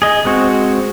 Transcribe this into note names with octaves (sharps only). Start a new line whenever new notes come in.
G#4 D#5
G#3 C4 F#4